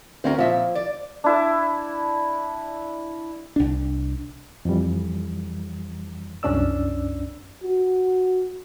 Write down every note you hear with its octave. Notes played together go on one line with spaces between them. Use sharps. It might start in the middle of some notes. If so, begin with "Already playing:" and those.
D2 C4 C#4 A#4
A#2 F3 E5
D5
D4 E4 A5
C2 D4
F2 E3 G3
C2 F#2 C#4 D4 D5 E6
F#4